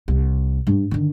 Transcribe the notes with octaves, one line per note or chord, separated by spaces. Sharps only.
C2
G2
D3 D#3